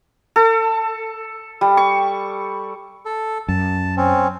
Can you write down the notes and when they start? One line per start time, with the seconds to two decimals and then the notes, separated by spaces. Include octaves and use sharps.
0.36 A4
1.61 G3
1.77 C#6
3.05 A4
3.48 F#2 A5
3.97 C4 C#4